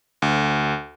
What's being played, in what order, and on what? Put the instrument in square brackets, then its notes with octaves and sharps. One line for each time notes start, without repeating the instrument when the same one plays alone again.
[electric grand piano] D2